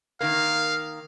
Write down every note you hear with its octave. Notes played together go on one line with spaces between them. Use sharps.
D#3 A#3 F5